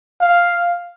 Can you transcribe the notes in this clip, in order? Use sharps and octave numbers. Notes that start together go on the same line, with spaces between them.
F5